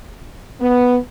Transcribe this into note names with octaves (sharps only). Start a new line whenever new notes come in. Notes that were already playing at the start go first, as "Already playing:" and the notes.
B3